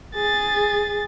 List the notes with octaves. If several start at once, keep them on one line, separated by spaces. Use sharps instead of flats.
G#4 A6